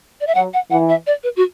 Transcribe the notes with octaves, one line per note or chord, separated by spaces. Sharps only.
D5
E5
F#3 F#5
F#5
E3 F#5
E5
D5
B4
F#4